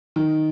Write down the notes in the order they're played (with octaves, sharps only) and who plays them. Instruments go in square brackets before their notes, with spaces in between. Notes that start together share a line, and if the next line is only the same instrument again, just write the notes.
[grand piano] D#3